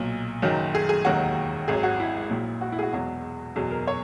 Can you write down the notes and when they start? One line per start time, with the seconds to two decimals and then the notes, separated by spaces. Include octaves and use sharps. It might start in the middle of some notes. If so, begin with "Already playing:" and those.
Already playing: B1 A#2 F#3
0.42 F#1 F#2 D#3 F#3
0.75 G#4
0.89 G#4
1.05 E1 D#2 D#3 F#3 F#4
1.68 G#1 G#2 F#3 G#4
1.83 F#4
2.00 E4
2.30 A#1 A#2 F#3
2.61 F#4
2.72 E4
2.79 G#4
2.83 F#4
2.93 E1 E2 B2 F#3 F#4
3.56 F#1 E2 B2 F#3 G#4
3.71 A#4
3.87 C#5